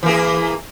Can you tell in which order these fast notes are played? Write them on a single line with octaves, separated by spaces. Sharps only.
E3 A#3 G#4